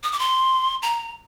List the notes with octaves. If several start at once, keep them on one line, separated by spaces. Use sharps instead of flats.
D#6
D6
C6
A#5